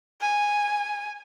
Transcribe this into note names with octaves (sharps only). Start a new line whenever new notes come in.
G#5